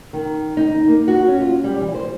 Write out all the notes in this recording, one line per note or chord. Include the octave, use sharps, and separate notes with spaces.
D#3
D#4
A#3
F#4
C#4
F4
G3
E3
C5